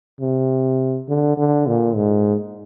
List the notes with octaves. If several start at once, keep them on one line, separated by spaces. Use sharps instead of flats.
C3
D3
D3
A#2
G#2